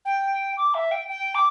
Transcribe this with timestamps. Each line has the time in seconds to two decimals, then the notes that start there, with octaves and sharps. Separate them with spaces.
0.05 G5
0.57 D6
0.74 E5
0.91 G5
1.08 G5
1.34 D6